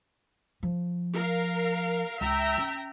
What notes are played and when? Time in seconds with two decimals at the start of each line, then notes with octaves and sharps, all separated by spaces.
0.63 F3
1.14 A#4 F5
2.21 C#2 E5 G5 A#5
2.58 C#4